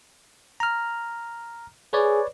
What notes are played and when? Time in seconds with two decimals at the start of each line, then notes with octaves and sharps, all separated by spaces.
0.60 A#5 F6
1.93 G#4 B4 C#5 D5